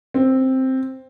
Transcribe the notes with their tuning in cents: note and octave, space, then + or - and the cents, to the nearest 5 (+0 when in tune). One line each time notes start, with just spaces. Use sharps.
C4 +5